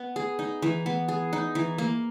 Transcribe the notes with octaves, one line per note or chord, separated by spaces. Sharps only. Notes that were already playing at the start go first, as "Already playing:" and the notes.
Already playing: B3
G#4
D#4
E3
B3
G#4
D#4
E3
A#3